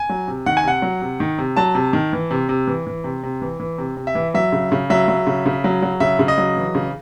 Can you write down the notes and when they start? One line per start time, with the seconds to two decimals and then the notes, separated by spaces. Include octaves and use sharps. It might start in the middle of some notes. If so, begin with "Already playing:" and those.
Already playing: G#5
0.09 F#3
0.28 C3
0.46 D#3 F#5
0.57 G#5
0.64 C3 F#5
0.82 F#3
1.02 C3
1.20 D#3
1.38 C3
1.57 F#3 A5
1.75 C3
1.93 D#3
2.13 E3
2.31 C3
2.49 C3
2.67 E3
2.87 E3
3.04 C3
3.23 C3
3.41 E3
3.60 E3
3.78 C3
3.97 C3
4.07 E5
4.15 E3
4.34 F#3 E5
4.52 C#3
4.72 C#3
4.90 F#3 E5
5.08 F#3
5.27 C#3
5.46 C#3
5.64 F#3
5.82 F#3
6.00 C#3 E5
6.19 C#3
6.28 D#5
6.38 F#3
6.57 E3
6.75 C#3